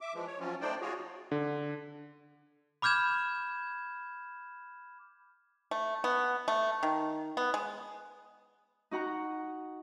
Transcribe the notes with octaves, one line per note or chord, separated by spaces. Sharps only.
E5 D6
E3 F3 G#3
C#5
F3 F#3 C4 C#4 F4
A3 D4 D#4 C5 D5 G5
F4 F#4 G#4 C#5
D3
B5 D6 F6 G6 G#6 E7
A3
B3
A3
D#3
B3
G#3
D#4 F#4 F#5 A#5